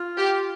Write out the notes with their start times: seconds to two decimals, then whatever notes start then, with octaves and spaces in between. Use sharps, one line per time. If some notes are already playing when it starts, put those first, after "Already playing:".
Already playing: F4
0.18 G4